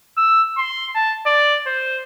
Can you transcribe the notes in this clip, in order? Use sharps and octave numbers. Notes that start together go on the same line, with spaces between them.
E6
C6
A5
D5
C5